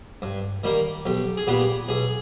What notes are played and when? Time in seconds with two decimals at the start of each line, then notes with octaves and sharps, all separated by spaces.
0.22 G2
0.64 D#3 G3 A#3
1.06 B1 G4
1.37 G#4
1.47 A#2 G3 B3 G4
1.88 B1 G#4